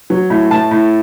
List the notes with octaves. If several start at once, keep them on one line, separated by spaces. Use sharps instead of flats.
F#3
A2
A2 A5
A2